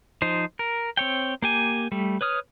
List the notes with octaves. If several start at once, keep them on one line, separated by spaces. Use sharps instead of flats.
F3 D#4 C5
A#4
C4 C#5 G5
A#3 G4 G#5
G3 A3
B4 C#5 D#6 F6